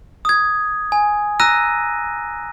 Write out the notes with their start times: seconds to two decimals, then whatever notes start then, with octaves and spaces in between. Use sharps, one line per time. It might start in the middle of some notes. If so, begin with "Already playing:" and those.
0.25 D#6 G#6
0.92 G#5
1.40 A#5 E6 F#6 A#6 D#7